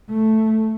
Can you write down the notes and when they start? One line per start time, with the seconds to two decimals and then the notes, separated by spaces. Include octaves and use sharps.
0.10 A3